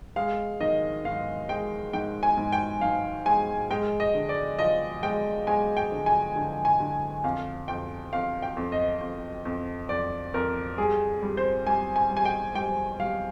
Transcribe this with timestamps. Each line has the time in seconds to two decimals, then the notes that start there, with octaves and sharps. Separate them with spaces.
0.16 G#3 F5
0.60 D#3 D#5
1.04 G#2 F5
1.49 G#3 G5
1.93 G#2 G5
2.23 G#5
2.37 G#2
2.52 G5
2.81 G#2 F5
3.26 G#3 G#5
3.70 G#3 G5
4.00 D#5
4.15 D3
4.29 D5
4.59 F3 D#5
5.03 G#3 G5
5.47 G#3 G#5
5.77 G5
5.92 D3
6.06 G#5
6.36 D3
6.65 G#5
6.80 D3
7.24 F2 F5
7.68 F2 G5
8.13 F2 F5
8.42 G5
8.57 F2
8.72 D#5
9.01 F2
9.45 F2
9.89 F2 D5
10.34 F2 A#4
10.78 G3 G#4
11.23 G3
11.37 C5
11.67 G3 G#5
11.96 G#5
12.11 G3
12.17 G#5
12.25 G5
12.55 G3 G5
13.00 G3 F5